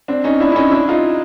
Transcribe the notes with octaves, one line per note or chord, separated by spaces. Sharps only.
C4 D4
C#4 D#4
D4 E4
E4
C#4 D#4
D4 E4
D#4 F4